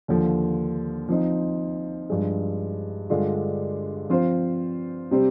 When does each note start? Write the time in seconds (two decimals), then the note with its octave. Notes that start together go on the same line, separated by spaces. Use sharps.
0.08 D#2 D3 F3
1.09 F3 C4 D#4
2.10 G2 F3 G#3
3.10 G2 D3 G#3 D4 F4
4.10 F3 C4 F4 C5
5.11 C3 G3 C4